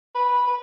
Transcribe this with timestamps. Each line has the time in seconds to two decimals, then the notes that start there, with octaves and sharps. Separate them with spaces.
0.15 B4
0.47 B4